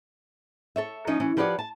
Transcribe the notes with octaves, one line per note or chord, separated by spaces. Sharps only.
A4 C#5 E5
F3 C#4 D#4
E3 C#4
F3 G4 B4 C#5 D5 F#5
A5